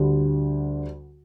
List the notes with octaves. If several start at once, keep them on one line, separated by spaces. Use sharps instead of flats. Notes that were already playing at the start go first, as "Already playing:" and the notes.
Already playing: D2 D3 G3